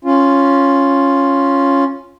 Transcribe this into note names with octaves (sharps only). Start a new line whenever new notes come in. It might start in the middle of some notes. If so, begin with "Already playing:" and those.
C#4 F4